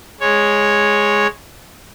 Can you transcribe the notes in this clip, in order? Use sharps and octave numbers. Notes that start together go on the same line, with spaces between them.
G#3 C#5